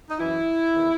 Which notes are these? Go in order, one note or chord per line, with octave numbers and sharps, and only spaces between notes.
D#4
F#2 E3 E4
E2 D#3